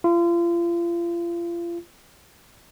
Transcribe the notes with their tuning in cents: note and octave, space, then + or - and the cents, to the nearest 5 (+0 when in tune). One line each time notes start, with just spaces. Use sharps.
F4 -35